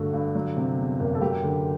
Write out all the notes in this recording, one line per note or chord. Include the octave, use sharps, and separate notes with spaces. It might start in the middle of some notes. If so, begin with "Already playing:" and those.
Already playing: G2 D3 A3 F#4
G2
F#3
C3
E2
F#1
A4
F#3 G4
D3